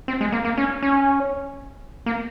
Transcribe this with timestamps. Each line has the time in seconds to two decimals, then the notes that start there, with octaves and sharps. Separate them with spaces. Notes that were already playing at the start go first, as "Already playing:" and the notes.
0.08 C4
0.21 G#3
0.32 A#3
0.45 A#3
0.58 C#4
0.83 C#4
2.06 A#3